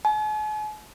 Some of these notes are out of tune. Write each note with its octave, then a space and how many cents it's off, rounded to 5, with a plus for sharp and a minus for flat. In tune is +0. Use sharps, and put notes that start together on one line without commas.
G#5 +45